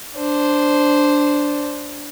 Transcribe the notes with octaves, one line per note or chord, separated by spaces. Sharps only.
D4 C5